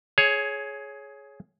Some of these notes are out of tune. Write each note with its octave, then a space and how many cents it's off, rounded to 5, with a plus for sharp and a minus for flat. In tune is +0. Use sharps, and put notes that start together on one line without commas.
G#4 +15 C#5 +0